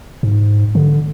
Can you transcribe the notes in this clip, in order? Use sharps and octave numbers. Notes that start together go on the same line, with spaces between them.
G#2
D3